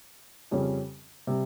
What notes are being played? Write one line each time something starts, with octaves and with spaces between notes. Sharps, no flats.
F2 C#3 G3 C#4
C3 G3